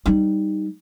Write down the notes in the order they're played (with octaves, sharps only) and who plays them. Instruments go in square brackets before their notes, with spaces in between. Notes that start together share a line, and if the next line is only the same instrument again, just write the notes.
[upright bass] G3 D#4